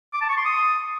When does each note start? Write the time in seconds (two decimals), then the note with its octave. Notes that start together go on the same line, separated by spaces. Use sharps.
0.13 D6
0.21 A5
0.29 C#6
0.37 C6
0.45 D#6